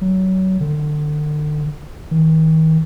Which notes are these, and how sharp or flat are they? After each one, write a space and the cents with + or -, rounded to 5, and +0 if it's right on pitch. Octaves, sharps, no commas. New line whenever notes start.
F#3 +25
D3 +35
D#3 +40